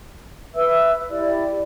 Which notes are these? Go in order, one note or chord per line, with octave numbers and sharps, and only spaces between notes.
B4 E5 E6
E4 G4 D5